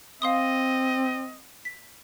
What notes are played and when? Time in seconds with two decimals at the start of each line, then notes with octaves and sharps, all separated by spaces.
0.22 C4 D#5 F5 C6 D#6
1.65 B6